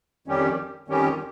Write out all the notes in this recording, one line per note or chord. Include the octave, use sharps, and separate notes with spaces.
F2 D#3 G3 C#4 G4
F2 D#3 G3 C#4 G4